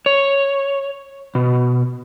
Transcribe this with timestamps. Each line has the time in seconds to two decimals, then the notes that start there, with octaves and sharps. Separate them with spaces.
0.06 C#5
1.35 B2